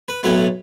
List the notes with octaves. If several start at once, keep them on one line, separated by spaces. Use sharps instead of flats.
B4
B1 A2 F#3 A3 B4